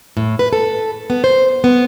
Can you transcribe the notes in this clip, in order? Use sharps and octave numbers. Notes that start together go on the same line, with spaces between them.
A2
B4
A4
B3
C5
B3